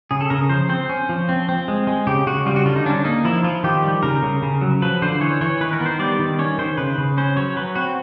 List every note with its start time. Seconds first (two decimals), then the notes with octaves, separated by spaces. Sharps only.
0.11 C#3 G#4
0.21 A4
0.30 C#3 A#4
0.49 F3 C5
0.69 C4 C5
0.89 C#4
1.09 F3
1.29 C4
1.49 C4
1.68 G#3
1.87 G#3
2.07 C#3 G4
2.27 C#3 F#4
2.46 G3 F4
2.56 F#4
2.66 D3 F4
2.76 D#4
2.86 C#4 D4
3.05 A#3 D#4
3.25 F3 E4
3.44 F3 F4
3.63 D#3 G4
3.84 G3
4.03 C#3 A#4
4.23 C#3
4.42 C#3
4.61 F#3
4.82 F3 B4
5.02 D3 C5
5.21 E3 C#5
5.41 E3 C#5
5.61 D#3 B4
5.73 A#4
5.80 B3
5.86 C5
5.99 G3 D5
6.19 D#3
6.39 C#4 C#5
6.59 D#3 C5
6.78 C#3 B4
6.98 C#3
7.17 C#4 C5
7.36 F#3 C#5
7.56 F#3 B4
7.75 C4 F#4